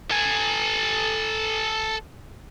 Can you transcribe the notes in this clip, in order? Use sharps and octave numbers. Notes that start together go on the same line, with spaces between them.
A4 G#5